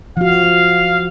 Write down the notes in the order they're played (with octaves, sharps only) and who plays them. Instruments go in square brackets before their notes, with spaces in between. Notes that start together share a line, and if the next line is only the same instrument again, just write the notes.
[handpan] F3 F#4 [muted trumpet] F5